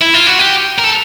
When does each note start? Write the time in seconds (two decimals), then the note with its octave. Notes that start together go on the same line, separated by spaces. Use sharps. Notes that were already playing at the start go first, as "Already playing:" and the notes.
0.02 E4
0.14 F4
0.27 F#4
0.39 G4
0.78 A#4
0.84 A4